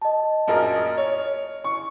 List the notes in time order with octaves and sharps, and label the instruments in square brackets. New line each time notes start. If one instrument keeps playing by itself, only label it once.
[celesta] D#5 A5
[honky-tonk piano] A#1 F#2 A#4 [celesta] D#5 F6
[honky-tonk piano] C#5
C#6